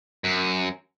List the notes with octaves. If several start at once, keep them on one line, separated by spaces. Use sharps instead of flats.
F#2